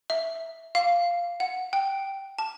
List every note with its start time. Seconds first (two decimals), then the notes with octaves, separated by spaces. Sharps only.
0.10 E5
0.75 F5
1.40 F#5
1.73 G5
2.39 A5